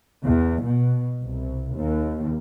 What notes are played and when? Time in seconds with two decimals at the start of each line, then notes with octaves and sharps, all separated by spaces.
0.24 E2
0.64 B2
1.22 C2
1.77 D#2